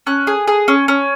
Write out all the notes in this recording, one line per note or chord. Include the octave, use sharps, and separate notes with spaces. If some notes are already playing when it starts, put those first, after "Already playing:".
C#4 F#6
G#4
G#4
C#4
C#4